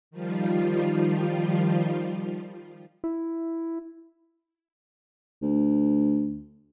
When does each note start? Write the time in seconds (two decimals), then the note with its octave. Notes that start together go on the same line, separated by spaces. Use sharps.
0.11 D#3 F3 G3 F4
3.04 E4
5.42 D2